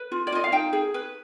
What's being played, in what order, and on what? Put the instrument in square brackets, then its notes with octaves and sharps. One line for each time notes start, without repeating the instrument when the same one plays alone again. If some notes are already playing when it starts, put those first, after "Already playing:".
Already playing: [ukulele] B4
F4
D5
F4 D#5
F5
D#4 G5
G#4
B4